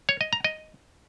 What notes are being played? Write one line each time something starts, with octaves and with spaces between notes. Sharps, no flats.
C#5
D#5
A#5
D#5